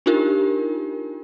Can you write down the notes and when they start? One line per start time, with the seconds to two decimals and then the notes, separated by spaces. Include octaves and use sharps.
0.06 D4 D#4 F4 G4 A#4